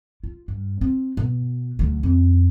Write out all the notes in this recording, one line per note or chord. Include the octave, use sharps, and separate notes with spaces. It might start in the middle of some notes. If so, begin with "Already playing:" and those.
F4
G2
C4
B2
D2 F#3
F2